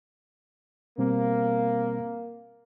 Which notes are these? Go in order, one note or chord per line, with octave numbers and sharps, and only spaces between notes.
B2 G3 A#3 C4